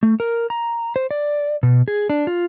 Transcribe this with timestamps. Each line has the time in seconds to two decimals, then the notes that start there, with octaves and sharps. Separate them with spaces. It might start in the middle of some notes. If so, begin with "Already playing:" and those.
0.03 A3
0.20 A#4
0.50 A#5
0.96 C5
1.11 D5
1.63 B2
1.88 G#4
2.10 D4
2.27 F4